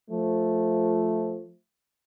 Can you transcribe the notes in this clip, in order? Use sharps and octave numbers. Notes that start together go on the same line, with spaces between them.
F3 A3